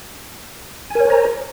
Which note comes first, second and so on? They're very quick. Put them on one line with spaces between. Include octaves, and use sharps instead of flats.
G#5 A#4 C#5 C5 A#5